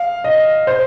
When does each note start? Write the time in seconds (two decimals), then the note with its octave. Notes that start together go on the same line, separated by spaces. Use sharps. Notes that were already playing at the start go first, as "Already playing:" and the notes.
Already playing: F5
0.24 D#5
0.67 C5